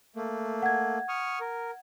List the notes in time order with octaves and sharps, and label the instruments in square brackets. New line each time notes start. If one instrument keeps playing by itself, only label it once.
[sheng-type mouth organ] A3 A#3
[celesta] F#5 G#6
[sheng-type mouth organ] C#6 D#6 F6
A#4